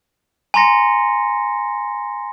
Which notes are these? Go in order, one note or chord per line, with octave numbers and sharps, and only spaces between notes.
G#5 A#5 C6 A#6 C#7